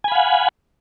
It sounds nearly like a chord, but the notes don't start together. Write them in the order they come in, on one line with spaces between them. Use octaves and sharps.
G#5 B5 F5 F#5